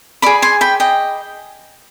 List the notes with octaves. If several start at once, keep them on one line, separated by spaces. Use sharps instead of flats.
G#4 D5 B5 D6
G#5 C6
G5 B5
D#5 G5